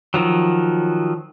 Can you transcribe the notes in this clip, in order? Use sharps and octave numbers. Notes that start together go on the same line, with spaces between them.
D#3 F3 F#3